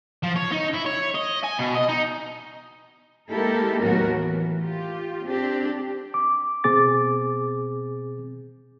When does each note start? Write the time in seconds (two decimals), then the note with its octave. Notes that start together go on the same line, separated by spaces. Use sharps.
0.23 F3
0.36 C#5
0.52 D#4
0.73 E4
0.86 C#5
1.15 D#5
1.44 G#5
1.59 B2
1.75 D#5
1.89 D#4
3.30 G#3 A#3 E4 G4 A4 A#4
3.80 D#2 A2 F#3 B3 F#4 A#4
4.09 E3
4.62 F4 G4
5.25 C4 D4 G4
6.14 D6
6.64 B2 C4 G#4 D6 A6